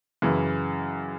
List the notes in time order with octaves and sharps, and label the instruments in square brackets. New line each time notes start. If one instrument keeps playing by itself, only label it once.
[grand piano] F#2 C#3 E3